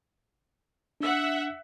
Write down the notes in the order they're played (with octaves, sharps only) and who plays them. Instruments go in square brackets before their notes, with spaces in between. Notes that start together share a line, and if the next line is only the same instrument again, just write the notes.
[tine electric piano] D4 E6 [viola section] E5 F#5